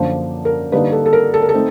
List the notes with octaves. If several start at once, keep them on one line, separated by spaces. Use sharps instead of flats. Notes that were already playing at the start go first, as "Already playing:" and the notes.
Already playing: F#2 D3 F3 A#3 D4 C5
A#4
D3 G3 A#3 D#4 B4
A4
A4
A#4
A4
A#4
A4
A3 C4 D#4